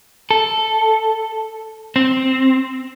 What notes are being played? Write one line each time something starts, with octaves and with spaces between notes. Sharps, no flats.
A4
C4